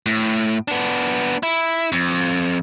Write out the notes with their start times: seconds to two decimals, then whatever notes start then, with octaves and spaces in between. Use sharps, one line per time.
0.06 A2
0.68 B3 D4
1.43 E4
1.92 F2